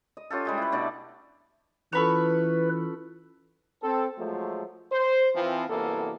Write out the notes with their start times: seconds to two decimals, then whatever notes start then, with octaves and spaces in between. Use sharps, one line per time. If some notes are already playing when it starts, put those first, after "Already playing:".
0.17 D#5
0.30 C#4 F4 G4 A4
0.45 G3 G#3 G4
0.58 E4 B4
0.72 B2 A3 D4 D5
1.93 E3 C#4 F4 A4 B4 B5 C#6
3.83 C4 A4
4.18 F3 F#3 G#3 A3
4.92 C5
5.35 E3 F3 C4
5.68 C2 F#2 E3 A#3 B3 A4